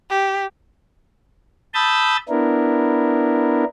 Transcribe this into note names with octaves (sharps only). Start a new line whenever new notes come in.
G4
A5 B5 D#6 E6 G6 A6
B3 D4 E4 A#4